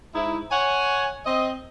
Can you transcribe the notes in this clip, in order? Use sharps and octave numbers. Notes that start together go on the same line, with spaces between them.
G#2 D#4 E4
C#5 F#5 G#5
C4 D#5